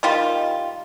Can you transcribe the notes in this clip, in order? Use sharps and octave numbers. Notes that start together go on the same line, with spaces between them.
D#3 G3 F4